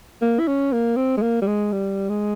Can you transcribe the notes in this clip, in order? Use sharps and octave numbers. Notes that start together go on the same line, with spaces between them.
A#3
E4
C#4
A#3
C4
G#3
A#3
G3
G#3
G3
G#3